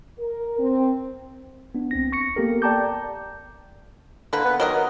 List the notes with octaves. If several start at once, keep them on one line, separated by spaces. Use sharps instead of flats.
A#4
C4
B3 D4
C#2 C4 A#6
C#6 A#6 C#7
A#3 B3 G4 A4 A#4
D5 G5 A5 A#5 D6 G6
D3 A#3 B4
B3
D#3 F#3 A#4 D#5
B3